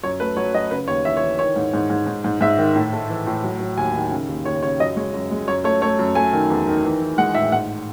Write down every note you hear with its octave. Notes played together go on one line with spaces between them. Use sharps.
F#2 C#5
A3 B4
F#3 C#5
F#3 D#5
C#3 B4
D#2 C#5
E3 E5
C#5
E3
D#3 C#5
G#2
G#2
G#2
G#2
G#2
G#2 E5
D#3
A2
A3
E3
A2
F#3
F#3
D#2 G#5
D#3
C#3
D#2
D#2 C#5
C#3 C#5
F#2 D#5
G#3 C#5
F#2
G#3
F#2 C#5
A3 C#5
A3 C#5
F#2
A3 G#5
D#3
E2
D#3
E3
E3
G#3 F#5
A2 E5
G#2 F#5